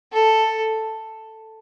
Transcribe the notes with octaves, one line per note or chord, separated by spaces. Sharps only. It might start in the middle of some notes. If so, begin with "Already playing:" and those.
A4